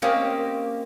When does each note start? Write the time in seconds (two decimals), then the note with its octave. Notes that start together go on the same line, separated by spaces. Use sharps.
0.02 A#3 C4 C#4 G4 D#5 F5